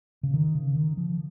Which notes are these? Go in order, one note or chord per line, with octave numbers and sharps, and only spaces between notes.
C#3
D#3
C#3
D#3
F3